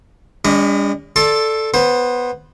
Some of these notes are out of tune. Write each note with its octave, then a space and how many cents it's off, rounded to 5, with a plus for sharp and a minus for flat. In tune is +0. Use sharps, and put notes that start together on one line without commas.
G3 +45 D4 -40 D#5 +0
A4 +0 D5 +5 C6 +25
B3 +0 C5 +20